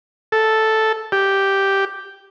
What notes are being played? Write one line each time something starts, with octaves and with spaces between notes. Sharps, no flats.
A4
G4